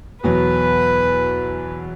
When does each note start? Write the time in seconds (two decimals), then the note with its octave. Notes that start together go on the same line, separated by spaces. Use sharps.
0.23 E2 B2 F#3 B4